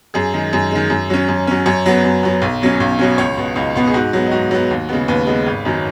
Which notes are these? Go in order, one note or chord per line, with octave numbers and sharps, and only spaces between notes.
F#2 G#4
D#3 G#3
F#2
D#3 G#3
F#2
F#3 C#4
F#2
F#3 C#4
F#2 C#5
F#3 B3
F#2
F#3 B3
B1
B2 F#3 C#4
B1
B2 F#3 C#4
C#2 C#5
B2 B3
C#2 D#4
B2 B3
G#4
G#2 F#4
F#3 B3
D#4
G#2 F#4
F#3 B3
D#2
C#3 G#3 B3
D#2 B4
C#3 G#3 B3
G#1
F#2 D#3 F#3